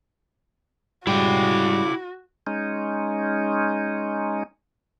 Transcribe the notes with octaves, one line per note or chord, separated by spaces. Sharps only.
G#2 C#3 G3 E4 F#4 G5 D6
G#3 C#4 D#4